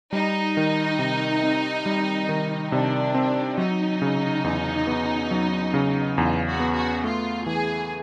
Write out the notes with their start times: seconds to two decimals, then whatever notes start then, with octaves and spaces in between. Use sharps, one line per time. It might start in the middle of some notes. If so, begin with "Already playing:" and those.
0.13 G3 D#4
0.57 D#3
0.99 C3
1.43 C4
1.86 G3
2.29 D#3
2.72 C3 D4
3.15 C4
3.58 F#3 D#4
4.02 C#3
4.44 E2
4.87 B3
5.31 F#3
5.74 C#3
6.18 E2 F4
6.45 F#4
6.60 B3
6.75 F#4
7.04 A3 F4
7.46 E3 G#4